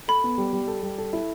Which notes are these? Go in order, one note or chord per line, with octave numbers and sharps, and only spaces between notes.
A4 B5
B3
G3
G3
A4
G3
A4
E4